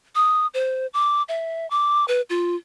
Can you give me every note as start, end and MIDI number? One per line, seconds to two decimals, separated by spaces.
0.15 0.47 87
0.54 0.87 72
0.94 1.23 86
1.29 1.69 76
1.70 2.05 86
2.08 2.21 71
2.30 2.56 65